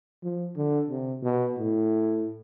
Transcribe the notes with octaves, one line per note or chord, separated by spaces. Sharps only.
F3
D3
C3
B2
A2